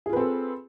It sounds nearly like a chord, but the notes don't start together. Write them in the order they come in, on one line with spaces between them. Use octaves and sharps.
G#4 F4 B4 C4 A4